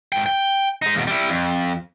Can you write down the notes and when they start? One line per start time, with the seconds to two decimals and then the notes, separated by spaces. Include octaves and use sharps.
0.12 G#2 G5
0.26 G5
0.82 G#3 D#4
0.95 D#2 B2
1.07 G3 E4
1.29 F2